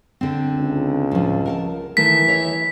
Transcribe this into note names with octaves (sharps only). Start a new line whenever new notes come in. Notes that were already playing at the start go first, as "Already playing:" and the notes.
D3 C4
C#2
A2 F3
A#4 F#5 A5
D#3 E3 A3 B6
C#5 D#5 E5